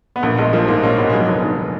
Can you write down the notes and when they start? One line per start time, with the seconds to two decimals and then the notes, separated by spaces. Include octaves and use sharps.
0.16 B3
0.23 A#1 A#3
0.38 A#1 G#3
0.53 F3 A#3
0.68 G#2 A#3
0.83 A#1 A#3 C#4
0.98 A#1 G#3 B3
1.09 A#3
1.13 F#3 G#3 B3
1.28 F1
1.44 D#3